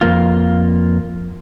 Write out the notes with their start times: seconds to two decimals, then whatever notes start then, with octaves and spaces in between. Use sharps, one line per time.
0.01 F2 A#3 F4